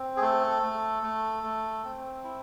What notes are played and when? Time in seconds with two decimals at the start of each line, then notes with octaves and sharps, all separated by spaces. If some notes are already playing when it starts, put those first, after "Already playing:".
Already playing: C4
0.17 G#4
0.21 A3 A4
0.62 A3
1.03 A3
1.44 A3
1.84 C4
2.24 E4